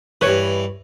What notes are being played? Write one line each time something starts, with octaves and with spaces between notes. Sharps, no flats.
G2 E3 B4 C#5